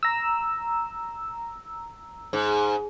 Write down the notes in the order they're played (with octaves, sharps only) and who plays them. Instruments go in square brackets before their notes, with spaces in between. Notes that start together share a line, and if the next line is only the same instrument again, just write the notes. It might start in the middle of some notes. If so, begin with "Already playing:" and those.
[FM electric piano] A#5 E6
[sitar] G#2